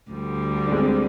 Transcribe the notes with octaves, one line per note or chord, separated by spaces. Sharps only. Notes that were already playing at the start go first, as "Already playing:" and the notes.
D2 D3 G3
D4
G#3 C4